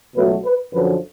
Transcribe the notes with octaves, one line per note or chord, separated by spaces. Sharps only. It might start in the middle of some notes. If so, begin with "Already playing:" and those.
C#2 B2 F#3 A3 B4
B4
F#2 D3 F3 B4